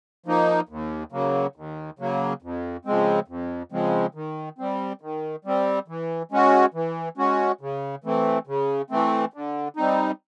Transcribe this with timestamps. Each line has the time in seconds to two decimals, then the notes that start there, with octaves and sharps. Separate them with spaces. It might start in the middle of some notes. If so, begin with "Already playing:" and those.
0.26 F3 A#3 D#4
0.69 D#2
1.12 C#3 F#3 A#3
1.56 D#2
1.99 C#3 F#3 A#3
2.42 F2
2.85 C#3 F3 G#3 C4
3.28 F2
3.72 C#3 F3 G#3 C4
4.15 D#3
4.58 G3 C4
5.01 D#3
5.45 G3 C4
5.88 E3
6.32 G#3 C#4 F#4
6.74 E3
7.17 G#3 C#4 F#4
7.61 C#3
8.04 E3 A3 C4
8.47 C#3
8.90 E3 A3 C4
9.34 D3
9.77 G3 C4 D#4